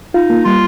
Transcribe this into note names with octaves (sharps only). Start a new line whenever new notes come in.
D#4 F4
A#3
G3 F4